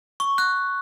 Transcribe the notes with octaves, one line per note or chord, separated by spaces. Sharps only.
C#6
F#6